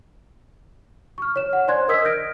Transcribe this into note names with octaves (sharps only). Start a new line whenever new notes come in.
C#6 F6
C#5 E7
F#5
C5 D5 G#5 C6 F#6 G#6
A#4 D#5 D#6 E6 G#6 B6
F6 G6 A#6 D7